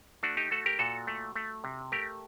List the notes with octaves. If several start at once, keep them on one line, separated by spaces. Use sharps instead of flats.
A3 D4 F#4
D#4 G4
A3 F#4 A4
G4 A#4
A#2 F#4 A4
A3
A3
C3
A3 G4 A#4